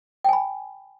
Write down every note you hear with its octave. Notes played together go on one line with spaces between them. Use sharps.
G5 G#5 B5